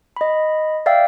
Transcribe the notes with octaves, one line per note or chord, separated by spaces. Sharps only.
D#5 B5
D5 E5 F5 G5 E6